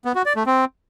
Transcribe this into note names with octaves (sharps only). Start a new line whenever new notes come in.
B3
F#4
D5
A3
C4